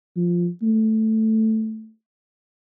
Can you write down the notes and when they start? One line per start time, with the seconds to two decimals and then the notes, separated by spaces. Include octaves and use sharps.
0.17 F3
0.62 A3